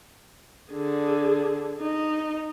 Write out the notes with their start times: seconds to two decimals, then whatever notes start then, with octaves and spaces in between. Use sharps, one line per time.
0.72 D3 G#4
1.80 D#4